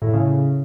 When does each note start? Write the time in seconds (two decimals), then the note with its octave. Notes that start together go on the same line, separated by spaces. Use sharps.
0.02 A2
0.13 C#3
0.25 C#3